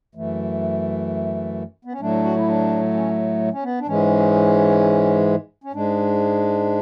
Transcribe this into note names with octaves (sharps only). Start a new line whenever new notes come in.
F#2 E3 A3
B3
C#4
A2 F#3 A3 D4
F#4
E4
D4
C#4
C#4
B3
D4
G#2 E3 G#3 C#4
C#4
G#2 G#3 D4